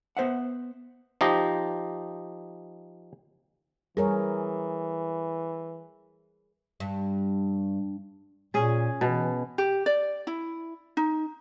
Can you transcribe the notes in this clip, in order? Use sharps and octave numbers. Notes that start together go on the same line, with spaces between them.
B3 C5 E5 F#5
F3 D#4 G4 D#5
E3 G3 G#4 A#4 C#5
G2
A#2 C#4 G#4
B2 E3
G4
D5
E4
D#4